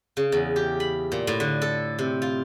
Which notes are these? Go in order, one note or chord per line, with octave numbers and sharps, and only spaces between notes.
C#3
E2
G4
B5
A#2
A2
D3
A4
C3
F4